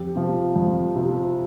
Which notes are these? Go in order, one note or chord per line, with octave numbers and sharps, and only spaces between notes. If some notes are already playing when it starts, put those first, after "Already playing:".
Already playing: F2 G4
C3 F3
F2
C3 F3